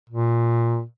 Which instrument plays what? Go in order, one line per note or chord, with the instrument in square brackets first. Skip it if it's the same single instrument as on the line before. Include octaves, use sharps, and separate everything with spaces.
[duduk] A#2